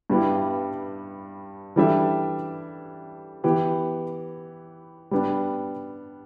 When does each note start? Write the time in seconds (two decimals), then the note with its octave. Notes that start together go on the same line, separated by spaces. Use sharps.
0.10 G2 G3 B3 E4
1.76 E3 G3 D4 A4 E5
3.44 E3 B3 G4 B4
5.11 G3 B3 D4